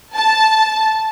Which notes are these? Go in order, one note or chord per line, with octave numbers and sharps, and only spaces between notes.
A5